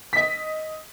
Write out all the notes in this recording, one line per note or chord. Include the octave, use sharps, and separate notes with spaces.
D#5 B6